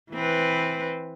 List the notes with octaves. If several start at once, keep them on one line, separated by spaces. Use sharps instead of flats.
E3 C4 B4